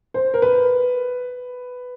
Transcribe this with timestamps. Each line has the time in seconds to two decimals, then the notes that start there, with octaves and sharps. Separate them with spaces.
0.14 C5
0.34 A#4
0.42 B4